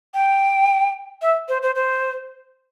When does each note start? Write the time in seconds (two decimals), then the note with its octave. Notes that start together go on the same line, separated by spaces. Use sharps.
0.14 G5
1.22 E5
1.49 C5
1.62 C5
1.75 C5